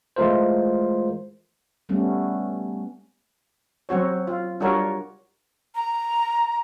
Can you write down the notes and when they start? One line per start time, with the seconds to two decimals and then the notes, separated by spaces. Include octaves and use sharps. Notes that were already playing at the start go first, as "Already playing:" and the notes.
0.16 E3 G#3 A3 F4 A#4 C5
1.89 G3 A3 B3 C#4
3.89 F#3 C4 F#4 C#5
4.27 F4
4.60 G3 D4 F4 F#4 A#4 C#5
5.75 A#5